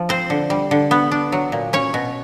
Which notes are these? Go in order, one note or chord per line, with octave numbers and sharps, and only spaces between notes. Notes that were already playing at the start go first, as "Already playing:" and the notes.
Already playing: F3
C4 C5
D3
G3
D3
B3
D4
F#3
A#2
C#4 C#5
B2